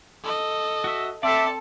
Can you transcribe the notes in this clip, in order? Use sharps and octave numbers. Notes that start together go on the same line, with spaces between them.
A4 D#5
F#4 E5
C4 A4 D5 E5 A5